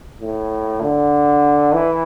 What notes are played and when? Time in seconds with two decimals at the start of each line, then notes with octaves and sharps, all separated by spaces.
0.21 A2
0.81 D3
1.73 E3